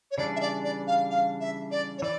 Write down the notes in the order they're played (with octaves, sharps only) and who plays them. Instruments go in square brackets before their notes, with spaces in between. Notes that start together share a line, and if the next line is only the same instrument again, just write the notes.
[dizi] C#5
[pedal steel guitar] C#3 E3 G3 D4 [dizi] D5
[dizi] E5
D5
D5
F5
F5
E5
D5
C#5
[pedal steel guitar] E3 [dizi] D5